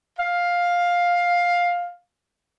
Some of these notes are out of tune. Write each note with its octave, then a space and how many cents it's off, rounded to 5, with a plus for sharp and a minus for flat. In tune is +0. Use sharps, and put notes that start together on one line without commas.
F5 +10